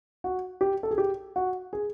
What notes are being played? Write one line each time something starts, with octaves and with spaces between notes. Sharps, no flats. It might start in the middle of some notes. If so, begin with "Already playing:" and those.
F#4
G4
A4
G#4
G4
F#4
G#4